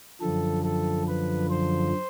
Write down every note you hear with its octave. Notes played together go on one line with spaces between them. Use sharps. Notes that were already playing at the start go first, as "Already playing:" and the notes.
F#2 D3 F3 A4
A4
B4
C5